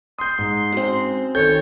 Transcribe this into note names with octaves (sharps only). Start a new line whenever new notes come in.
C6 D#6 G6
G#2
F#2 C4
D#3 A4 C#5 G6